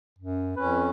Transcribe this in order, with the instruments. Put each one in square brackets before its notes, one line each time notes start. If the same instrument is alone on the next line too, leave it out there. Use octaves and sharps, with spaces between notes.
[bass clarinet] F#2
[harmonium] F2 C#4 [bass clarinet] B4